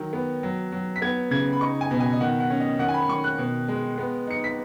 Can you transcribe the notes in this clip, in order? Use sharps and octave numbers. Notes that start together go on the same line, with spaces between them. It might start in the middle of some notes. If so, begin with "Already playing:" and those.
Already playing: D#3 F#3
B3
F#3
F#3
B6
B3 G#6
C#3 G#6
B5
D#4 C#6
G#5
B2
G#5
D#5
D#3 F#5
F#5
C#4
D#5
D#3 F#5
G#5
B5
D#3 C#6
F#6
B2
G#3
B3
D#4 C#7
B6